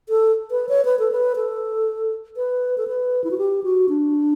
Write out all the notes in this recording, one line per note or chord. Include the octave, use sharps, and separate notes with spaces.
A4
B4
C#5
B4
A4
B4
A4
B4
A4
B4
E4
F#4
G4
F#4
D4